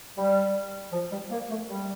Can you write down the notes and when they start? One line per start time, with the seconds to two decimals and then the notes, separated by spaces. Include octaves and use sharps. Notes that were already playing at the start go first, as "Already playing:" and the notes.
0.17 G3
0.92 F3
1.11 G3
1.31 A#3
1.49 A3
1.69 G3